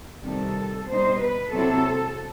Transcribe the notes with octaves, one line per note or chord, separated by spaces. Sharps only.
C3 D#3 G3 A4
B2 G3 D#4 C5
B4
C3 F#3 C4 E4 A4